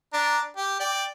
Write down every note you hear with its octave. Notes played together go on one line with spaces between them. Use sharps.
D4 A#5
G4
D5 G5